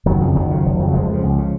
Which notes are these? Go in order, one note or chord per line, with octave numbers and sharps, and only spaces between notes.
F#1 D#3 F#3
F2 C#3 F3
F#1 D#3 F#3
F2 C#3
F1
F2 C#3
F#3
F1 F3 G#3
F2 C#3
C#2
C#3